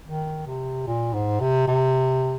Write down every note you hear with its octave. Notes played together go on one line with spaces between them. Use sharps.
D#3
C3
A#2
G#2
C3
C3